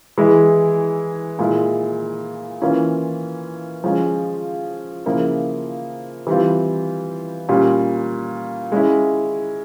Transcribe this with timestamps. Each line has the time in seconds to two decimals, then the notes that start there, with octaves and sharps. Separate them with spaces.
0.18 E3 G#3 E4 G#4
1.39 A#2 G#3 E4
2.62 E3 A#3 C#4 F4
3.84 F3 G#3 C#4
5.05 C#3 F3 A#3 E4 G#4
6.27 E3 G3 C4 F4
7.49 A#2 G3 C#4 G4
8.72 G#3 C#4 E4